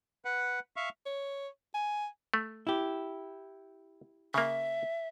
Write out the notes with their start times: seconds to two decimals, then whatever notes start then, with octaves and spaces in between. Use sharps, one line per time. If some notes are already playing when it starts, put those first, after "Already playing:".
0.25 B4 F#5
0.76 E5 F5 C#6
1.06 C#5
1.74 G#5
2.34 A3
2.67 E4 G4
4.34 C#3 A#3 E5